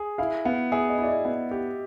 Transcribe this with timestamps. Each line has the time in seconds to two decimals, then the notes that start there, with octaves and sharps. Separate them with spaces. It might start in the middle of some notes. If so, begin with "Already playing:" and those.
Already playing: G#4
0.18 E4 F5
0.45 B3 F5
0.72 G#4 E5
0.89 D#5
0.98 E4 D5
1.08 D#5
1.25 B3
1.51 G4